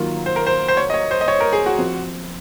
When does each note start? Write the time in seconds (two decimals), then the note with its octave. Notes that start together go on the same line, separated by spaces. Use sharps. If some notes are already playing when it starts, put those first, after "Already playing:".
Already playing: D#3 F#3 A#3 F4
0.26 C5
0.36 A#4
0.46 C5
0.68 C5
0.77 C#5
0.90 D#5
0.94 C#5
1.11 C5
1.21 D#5
1.28 C#5
1.40 A#4
1.53 G#4
1.66 F#4
1.78 F3 C4 F4